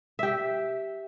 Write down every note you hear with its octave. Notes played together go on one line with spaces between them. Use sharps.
G4 E5